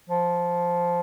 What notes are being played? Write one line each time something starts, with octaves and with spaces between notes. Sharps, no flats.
F3